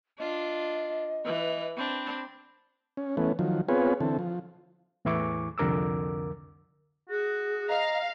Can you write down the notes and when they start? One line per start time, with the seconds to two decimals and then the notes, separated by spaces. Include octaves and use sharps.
0.19 D4 F4 D#5
1.25 E3 B4
1.77 C4 D4 B5
2.97 C#4
3.17 E3 A3 B3 C#4
3.39 D#3 F3 F#3
3.69 B3 C4 F4 G#4 B4 C#5
4.01 D3 E3 C4 A4
4.19 F3
5.05 E2 A2 E3 E4 C#6 D6
5.58 C2 F2 D3 A#4 D6 E6
7.10 F#4 G#4
7.69 D#5 F5 A#5